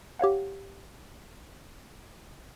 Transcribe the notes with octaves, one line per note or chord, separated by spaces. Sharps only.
G4 C#5 F5 F#5